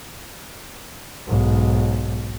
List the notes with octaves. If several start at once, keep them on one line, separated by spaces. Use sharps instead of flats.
B1 G#2